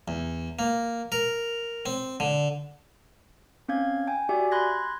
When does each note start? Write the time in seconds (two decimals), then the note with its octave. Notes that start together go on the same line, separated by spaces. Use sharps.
0.08 E2
0.59 A#3
1.12 A#4
1.86 C4
2.20 D3
3.68 C4 C#4 F5 G#6
4.07 G5 G#5
4.29 F#4 G4 D5 E5 G#5
4.52 B5 C6 F#6 G#6 A#6